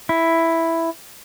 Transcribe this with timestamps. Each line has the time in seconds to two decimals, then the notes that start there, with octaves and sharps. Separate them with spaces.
0.09 E4